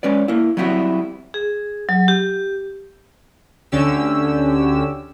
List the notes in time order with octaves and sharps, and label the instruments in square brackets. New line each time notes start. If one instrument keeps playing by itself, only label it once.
[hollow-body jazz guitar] G#3 C#4 B4 D5
A#3 E4
F#3 G3 C4 E4 F#4
[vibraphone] G#4
F#3
G4
[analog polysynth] D2 D3 C#4 G4 E6